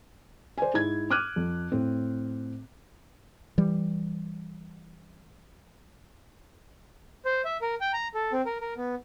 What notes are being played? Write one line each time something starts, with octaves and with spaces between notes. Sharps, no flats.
C5 D5 G#5
G#2 E4 G#6
D6 F6 F#6 G#6 D#7
F2
A2 C4
E3 G3
C5
E5
A#4
G5
A#5
A4
C4
A#4
A#4
B3